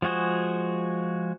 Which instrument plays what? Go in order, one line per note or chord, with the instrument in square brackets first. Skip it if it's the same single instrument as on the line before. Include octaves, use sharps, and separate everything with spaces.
[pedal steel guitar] F3 G#3 F#4 G#4 C5